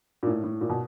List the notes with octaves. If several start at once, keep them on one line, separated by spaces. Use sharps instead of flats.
A#2
A2
A2
A#2
B2